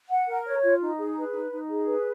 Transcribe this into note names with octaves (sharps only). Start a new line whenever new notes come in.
F#5
A#4
C#5
F4
D#4
G#4
B4
D#4
D#4
G#4
B4